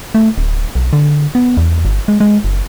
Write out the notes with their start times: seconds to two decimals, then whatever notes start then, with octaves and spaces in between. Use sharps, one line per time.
0.15 A3
0.38 D1
0.75 B1
0.93 D3
1.35 B3
1.57 E2
1.85 G1
2.08 G#3
2.20 G#3
2.44 F#1